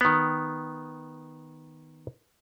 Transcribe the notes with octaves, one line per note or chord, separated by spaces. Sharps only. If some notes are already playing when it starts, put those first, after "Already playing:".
D#3 B3